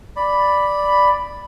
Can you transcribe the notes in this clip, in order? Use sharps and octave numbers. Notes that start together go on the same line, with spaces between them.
D5 B5